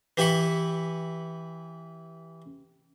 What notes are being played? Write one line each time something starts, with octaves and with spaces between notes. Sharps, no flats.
E3 G4 E5 B5 C#6